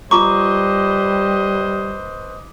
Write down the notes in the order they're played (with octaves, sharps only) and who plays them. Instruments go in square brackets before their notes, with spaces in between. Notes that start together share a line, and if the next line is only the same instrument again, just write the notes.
[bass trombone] G3 [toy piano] F4 A#5 C#6 [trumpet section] B4 C5 D#5 [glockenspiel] D6